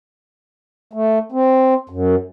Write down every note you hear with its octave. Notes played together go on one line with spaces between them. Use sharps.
A3
C4
F#2